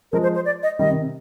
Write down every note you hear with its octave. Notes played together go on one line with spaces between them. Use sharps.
F3 G#3 A#4
C5
C5
D5
D#5
D#3 G3 D#5
C3 D#3
C3